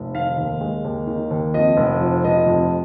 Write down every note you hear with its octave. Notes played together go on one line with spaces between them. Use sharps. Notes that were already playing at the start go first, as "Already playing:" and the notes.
Already playing: F1
D#3 F5
D#2
G#3
D#2
D#3
D#2
F2 D#5
F1
F3
F1 D#5
F2